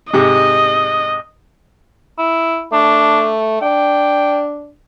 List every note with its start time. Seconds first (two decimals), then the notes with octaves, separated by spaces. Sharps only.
0.13 G#2 C3 D#5
2.18 E4
2.73 A3 D4
3.62 D4 G5